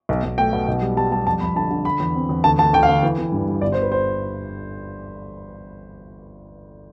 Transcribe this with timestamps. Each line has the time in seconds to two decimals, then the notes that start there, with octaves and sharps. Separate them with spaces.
0.09 B1
0.24 B1
0.38 A3 G5
0.53 B2
0.68 B1
0.82 G3
0.97 G3 A5
1.12 G3 A5
1.26 F2 A5
1.40 F2 B5
1.56 D3 A5
1.70 D3
1.85 D3 B5
2.00 E2
2.15 C4
2.29 E2
2.44 D2 A5
2.58 D2 A5
2.73 D2 G5
2.83 F5
2.89 D2
3.03 E3
3.18 E3
3.32 G2
3.47 G3
3.61 G1 D5
3.72 C5
3.76 G1
3.82 B4
3.92 C5